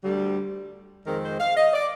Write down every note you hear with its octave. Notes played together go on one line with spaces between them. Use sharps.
D2 D3 G3
F2 D#3 G#3 C4 A#4
C5
F5
D#5
D5